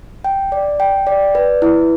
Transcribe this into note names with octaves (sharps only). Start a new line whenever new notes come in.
G5
D5
G5
D5
B4
E4